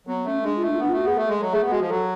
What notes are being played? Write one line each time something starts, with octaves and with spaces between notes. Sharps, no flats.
F#3 B3
A3 C#4
G#3 D4
F4
A3
D4
F4
B3 D4
F4
A3 F#4
B3 G#4
A3 A4
G#3
F#3
A3 G#4
B3
G#3 F#4
F3
F#3 A4